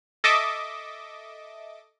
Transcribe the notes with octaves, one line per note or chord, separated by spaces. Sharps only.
A4 D#5 E5 D6